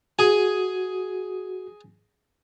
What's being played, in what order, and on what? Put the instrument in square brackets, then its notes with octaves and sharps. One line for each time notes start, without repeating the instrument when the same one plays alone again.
[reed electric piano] F#4 [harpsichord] G#4 G#5